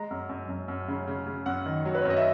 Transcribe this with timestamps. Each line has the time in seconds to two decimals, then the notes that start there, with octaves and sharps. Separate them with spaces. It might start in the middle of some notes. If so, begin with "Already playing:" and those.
Already playing: G#3 A#5
0.11 F#2
0.29 F#2
0.49 F#2
0.68 F#2
0.88 C#3
1.07 C#3
1.27 C#3
1.46 F#2 F#5
1.66 D#3
1.85 F#3
1.95 B4
2.02 C#5
2.05 F#2
2.10 D#5
2.17 E5